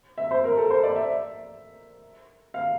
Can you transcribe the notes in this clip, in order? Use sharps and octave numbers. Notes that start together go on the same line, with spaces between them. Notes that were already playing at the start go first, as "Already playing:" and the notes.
E5
C5
A#4
A4
C5
D5
E5
F5